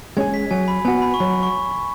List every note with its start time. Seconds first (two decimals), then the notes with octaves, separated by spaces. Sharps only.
0.17 G#3 C#4 G#4 G#6
0.34 B6
0.51 F#3 G#5
0.68 B5
0.85 B3 F#4 G#5
1.02 B5
1.14 C#6
1.19 F#3 B5
1.43 C#6